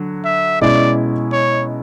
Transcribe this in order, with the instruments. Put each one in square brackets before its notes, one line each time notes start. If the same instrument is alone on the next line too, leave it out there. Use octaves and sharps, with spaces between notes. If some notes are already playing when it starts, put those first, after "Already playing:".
Already playing: [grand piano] D3 F#3
[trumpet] E5
[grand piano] B2 G#3 C#4 E4 [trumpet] D5
[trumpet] C#5